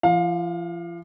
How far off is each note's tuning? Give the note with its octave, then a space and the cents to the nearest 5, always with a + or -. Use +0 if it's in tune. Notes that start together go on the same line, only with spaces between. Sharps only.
F3 -40 F5 +25